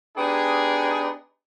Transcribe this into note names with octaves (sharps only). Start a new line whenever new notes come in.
B3 D4 D#4 G4 G#4